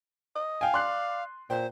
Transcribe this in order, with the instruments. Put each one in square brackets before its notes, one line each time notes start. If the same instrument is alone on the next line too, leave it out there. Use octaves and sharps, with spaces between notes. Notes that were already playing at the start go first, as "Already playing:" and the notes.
[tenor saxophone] D#5
[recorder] F5 [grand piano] G5 G#5
[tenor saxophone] D5 [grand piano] C6 F#6 C7
[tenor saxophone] A#2 [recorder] C5 [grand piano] G5